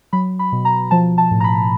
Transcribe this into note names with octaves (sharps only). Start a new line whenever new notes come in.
F#3 B5
B5
B2
A#5
F3 A5
A5
A2
A#5
B5